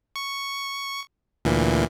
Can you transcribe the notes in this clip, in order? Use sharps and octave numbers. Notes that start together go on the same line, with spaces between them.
C#6
D2 A#2 E3